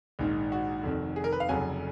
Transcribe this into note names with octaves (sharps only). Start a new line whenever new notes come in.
A#1 G#2 D#3
F#4
F1 F2 D#3
G#4
A#4
B4
F5
F1 F2 C#3 F#3 G#5